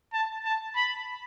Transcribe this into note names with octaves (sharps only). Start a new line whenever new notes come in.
A5
A5
B5